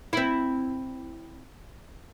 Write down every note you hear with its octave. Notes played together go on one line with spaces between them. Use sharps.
C4 E4